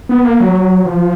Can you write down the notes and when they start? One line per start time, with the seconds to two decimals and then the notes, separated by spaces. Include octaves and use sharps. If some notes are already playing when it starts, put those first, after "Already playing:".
0.09 B3
0.24 A#3
0.40 F#3
0.85 F3